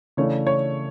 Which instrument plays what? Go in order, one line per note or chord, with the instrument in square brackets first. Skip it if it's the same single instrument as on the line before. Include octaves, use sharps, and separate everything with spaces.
[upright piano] C#3 E3 A3 D4 C#5
C#5